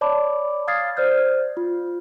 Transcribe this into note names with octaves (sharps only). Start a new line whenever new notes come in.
C#5 D5 A5 B5 D6
F5 D#6 F6 G#6 A6 C7
C5 D5 F6 G6
F4